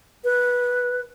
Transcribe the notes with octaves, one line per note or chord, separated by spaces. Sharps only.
B4